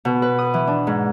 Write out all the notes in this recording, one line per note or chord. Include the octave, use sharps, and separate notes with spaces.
B2
B4
D#6
E3
D4
G#2